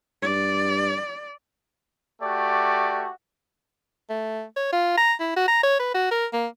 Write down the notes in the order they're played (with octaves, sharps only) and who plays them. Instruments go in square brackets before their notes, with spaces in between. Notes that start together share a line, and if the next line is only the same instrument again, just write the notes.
[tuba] G2 [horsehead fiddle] D5
[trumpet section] A3 F#4 G4 D5
[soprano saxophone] A3
C#5
F4
A#5
E4
F#4
A#5
C#5
B4
F#4
A#4
A#3